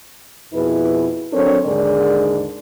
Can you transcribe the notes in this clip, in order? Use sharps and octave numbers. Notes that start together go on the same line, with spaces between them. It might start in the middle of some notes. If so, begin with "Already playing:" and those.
F2 B2 E4 G#4 B4
F#3 C4 D4 A4 A#4 C#5
D#2 G#2 D3 G#4 A#4 D5